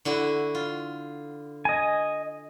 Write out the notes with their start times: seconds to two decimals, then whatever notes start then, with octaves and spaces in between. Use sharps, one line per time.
0.05 D3 E4 F#4
0.55 F4
1.65 D#5 G#5